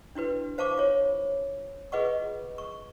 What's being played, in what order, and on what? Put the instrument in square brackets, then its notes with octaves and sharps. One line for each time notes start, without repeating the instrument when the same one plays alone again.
[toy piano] D4 E4 F#4 B4
C5 F5 A5 C#6 D6
F4 C#5
F4 G#4 B4 D#5 F#5 C#6
C#6